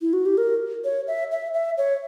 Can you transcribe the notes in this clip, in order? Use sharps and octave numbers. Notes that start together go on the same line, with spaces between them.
E4
F#4
G4
A#4
C#5
E5
E5
E5
C#5